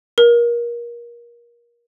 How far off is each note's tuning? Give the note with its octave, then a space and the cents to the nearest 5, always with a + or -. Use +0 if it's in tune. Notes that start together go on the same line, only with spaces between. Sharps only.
A#4 +25